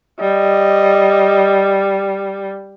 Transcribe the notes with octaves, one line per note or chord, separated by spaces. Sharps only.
G3 D#5